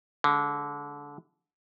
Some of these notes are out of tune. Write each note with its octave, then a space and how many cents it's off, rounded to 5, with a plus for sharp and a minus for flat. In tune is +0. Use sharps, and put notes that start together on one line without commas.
D3 -25 G#3 +0